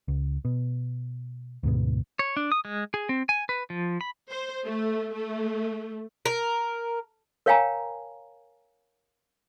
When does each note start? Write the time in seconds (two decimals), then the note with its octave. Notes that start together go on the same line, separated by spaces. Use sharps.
0.08 C#2
0.45 B2
1.63 D2 G#2 B2
2.19 C#5
2.37 D4
2.52 D#6
2.65 G#3
2.94 G#4
3.09 C4
3.29 G#5
3.49 B4
3.70 F3
4.01 B5
4.31 C5
4.65 A3
5.14 A3
6.26 A#4
7.46 A#4 C#5 F5 G5 G#5 A#5